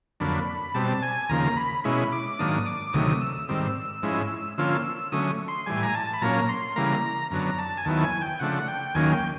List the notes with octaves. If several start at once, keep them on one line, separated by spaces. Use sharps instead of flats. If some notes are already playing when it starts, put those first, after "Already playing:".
F2 D3 F#3 A#3 D4 B5
B2 G3 C4 A5
G#5
D#2 C#3 F3 A#3 A#5
B5
B2 G#3 C#4 E4 B5
D6
G#2 D#3 F#3 A#3 D4 D#6
D6
D2 C3 D#3 F#3 A3 D#6
E6
G#2 D#3 G3 C4
G#2 F3 G#3 C#4 E4
D3 F3 A#3 C#4 F4 E6
D3 F#3 A3 C#4 D#6
C6
A2 E3 G3 G#5
A#5
A5
B5
A#2 F#3 A#3 C#4 A#5
C6
C#3 E3 G3 A#3 A#5
F#2 D3 F#3 B3 D4 A#5
A5
G#5
D#2 D#3 F#3 B3 E4 A5
G#5
G5
C#3 F3 A3 D4 F#5
G5
D#2 D#3 F#3 A#3 C#4 G#5
G5